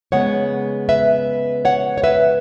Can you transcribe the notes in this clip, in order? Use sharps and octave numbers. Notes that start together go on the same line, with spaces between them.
C#3 G#3 B3 C#5 F#5
B4 E5
C#5 F#5
C#5
B4 E5